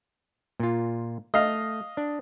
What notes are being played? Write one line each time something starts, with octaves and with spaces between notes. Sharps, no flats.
A#2 F4
A3 D#5 F5
D4